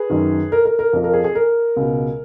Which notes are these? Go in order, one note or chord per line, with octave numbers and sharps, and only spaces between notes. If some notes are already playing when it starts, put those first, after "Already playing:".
Already playing: G#4 B4
F#2 D#3
A#4
A#4
A#4
F2 F3
A#4
G#4
G#4
A#4
C#2 B2